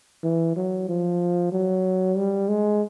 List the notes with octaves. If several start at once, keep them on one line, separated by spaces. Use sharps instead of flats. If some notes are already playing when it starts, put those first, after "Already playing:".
E3
F#3
F3
F#3
G3
G#3